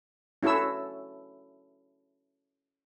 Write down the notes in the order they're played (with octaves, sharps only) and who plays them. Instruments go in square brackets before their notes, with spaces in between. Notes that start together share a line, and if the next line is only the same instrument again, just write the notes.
[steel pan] C#4 E4 F#4 A4 E6